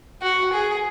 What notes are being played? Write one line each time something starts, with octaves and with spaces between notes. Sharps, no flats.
F#4
G#4